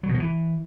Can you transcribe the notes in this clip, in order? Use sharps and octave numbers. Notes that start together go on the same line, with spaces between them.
F#3
B2
F3
E3